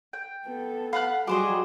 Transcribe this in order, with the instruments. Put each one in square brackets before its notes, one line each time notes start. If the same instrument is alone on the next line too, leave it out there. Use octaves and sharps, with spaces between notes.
[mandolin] G5
[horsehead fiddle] B3 A4
[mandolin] F5 F#5 F#6 [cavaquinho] B5
[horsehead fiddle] F#3 F#4 [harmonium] G3 G#4 [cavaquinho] F4 C5 D#5 [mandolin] D6